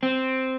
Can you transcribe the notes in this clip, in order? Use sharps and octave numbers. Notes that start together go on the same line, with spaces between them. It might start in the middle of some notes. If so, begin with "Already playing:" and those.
C4